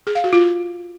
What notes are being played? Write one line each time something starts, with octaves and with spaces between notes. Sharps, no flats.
G#4
F5
F#4
F4